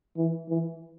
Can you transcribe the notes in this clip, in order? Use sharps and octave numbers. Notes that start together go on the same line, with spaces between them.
E3
E3